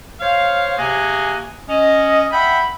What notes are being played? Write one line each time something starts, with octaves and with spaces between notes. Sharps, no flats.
C5 C#5 F5
C3 A#3 F#4 G#4 G#5
C#4 D#5
E5 F#5 G5 B5